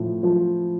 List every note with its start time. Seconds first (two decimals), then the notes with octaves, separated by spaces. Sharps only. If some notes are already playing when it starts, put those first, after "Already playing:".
Already playing: A2 F3
0.23 F3